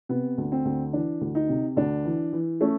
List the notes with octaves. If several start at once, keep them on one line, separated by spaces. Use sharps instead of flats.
C3 B3
D2
C4
D2
E3 D4
D2
D#4
C3
D2 D4
E3
E3
A3 C#4